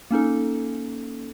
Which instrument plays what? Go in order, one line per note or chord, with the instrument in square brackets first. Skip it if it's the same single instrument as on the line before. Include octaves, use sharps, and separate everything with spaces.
[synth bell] A#3 C#4 D#4 A4